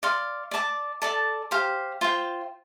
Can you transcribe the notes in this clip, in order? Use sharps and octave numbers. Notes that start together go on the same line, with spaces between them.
D5 F5 C6
D5 A5 D6
A4 D5 A5
G4 C5 F5
F4 C5 G5